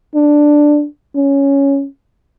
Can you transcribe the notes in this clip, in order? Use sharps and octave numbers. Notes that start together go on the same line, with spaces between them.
D4
C#4